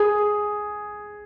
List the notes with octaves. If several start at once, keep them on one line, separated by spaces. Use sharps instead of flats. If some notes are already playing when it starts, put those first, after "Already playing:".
Already playing: G#4